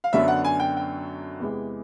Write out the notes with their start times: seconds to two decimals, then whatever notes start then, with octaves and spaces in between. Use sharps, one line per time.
0.04 F5
0.12 F#2 D3 F#3 B3 D4 E5
0.28 F#5
0.44 G#5
0.60 G5
0.76 G5
1.40 E2 C3 E3 G#3